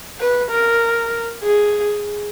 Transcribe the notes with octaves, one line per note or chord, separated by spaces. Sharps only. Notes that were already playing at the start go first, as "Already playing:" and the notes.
B4
A#4
G#4